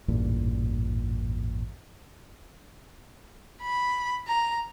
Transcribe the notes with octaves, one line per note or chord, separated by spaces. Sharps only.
A1 E2 G2 A#2
B5
A#5